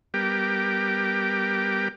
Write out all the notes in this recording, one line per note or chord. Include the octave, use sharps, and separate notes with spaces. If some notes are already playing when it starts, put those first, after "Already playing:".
G3 B3 G4 A#4 G5 D6